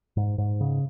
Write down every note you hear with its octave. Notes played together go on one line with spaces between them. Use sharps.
G#2
G#2
C#3